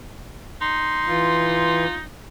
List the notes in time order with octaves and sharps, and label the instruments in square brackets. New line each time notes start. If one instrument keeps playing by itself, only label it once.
[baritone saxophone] D#4 [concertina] C6
[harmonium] E3 [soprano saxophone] F4